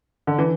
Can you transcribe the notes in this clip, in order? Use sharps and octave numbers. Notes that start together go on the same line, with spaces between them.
D3
E3